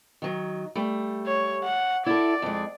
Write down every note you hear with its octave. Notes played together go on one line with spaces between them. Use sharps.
D#3 F#3
G3 A3
C#5
F#5
E4 A4 D5
F2 G#3